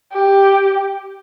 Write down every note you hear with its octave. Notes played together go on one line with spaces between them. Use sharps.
G4